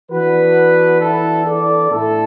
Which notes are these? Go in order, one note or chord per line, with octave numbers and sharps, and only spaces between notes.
E3 B3 D4 F#4 B4
E4 A4
A4 D5
A2 A3 D4 E4 A4